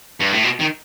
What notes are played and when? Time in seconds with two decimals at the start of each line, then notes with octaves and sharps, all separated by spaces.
0.21 G2
0.32 A2
0.44 B2
0.61 D#3